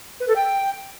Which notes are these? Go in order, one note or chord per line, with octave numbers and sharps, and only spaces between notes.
B4
A4
G5